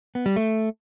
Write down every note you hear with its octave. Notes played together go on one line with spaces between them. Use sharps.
B3
G3
A3